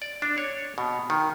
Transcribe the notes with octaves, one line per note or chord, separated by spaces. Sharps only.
D5
D4
C#5
B2
D#3